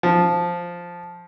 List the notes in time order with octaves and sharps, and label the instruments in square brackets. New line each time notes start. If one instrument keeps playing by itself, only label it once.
[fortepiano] F3